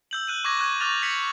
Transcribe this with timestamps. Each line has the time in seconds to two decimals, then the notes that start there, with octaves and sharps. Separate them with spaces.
0.11 E6 G6 F#7
0.27 F#6 D#7 F#7
0.44 C#6 D6 G#6 A#6
0.59 C#6 F#6 G#6 D#7
0.80 C#6 D6 F6 F#6 A6 F7
1.02 G#6 B6 C#7 F#7